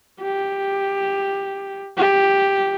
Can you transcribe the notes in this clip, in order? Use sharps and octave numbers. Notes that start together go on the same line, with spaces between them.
G4
G4